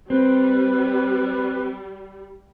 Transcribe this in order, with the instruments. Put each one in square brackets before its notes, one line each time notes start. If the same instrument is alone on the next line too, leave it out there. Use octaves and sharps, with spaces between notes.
[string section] G3 [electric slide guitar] C4 [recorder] B4